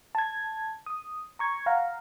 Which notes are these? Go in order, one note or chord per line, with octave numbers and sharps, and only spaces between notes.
A5 G#6
D#6
A#5 C#6 G#6
F5 F#5 A#5